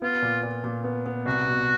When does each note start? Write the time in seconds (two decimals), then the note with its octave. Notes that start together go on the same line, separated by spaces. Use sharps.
0.02 B3 F4
0.22 A#2
0.43 A#2
0.64 A#2
0.84 B3
1.06 B3
1.26 C2 F#4
1.47 B2